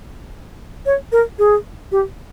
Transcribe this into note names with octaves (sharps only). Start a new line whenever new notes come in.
C#5
A#4
G#4
G4